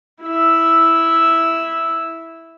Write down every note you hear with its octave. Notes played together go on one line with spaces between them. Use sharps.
E4 E5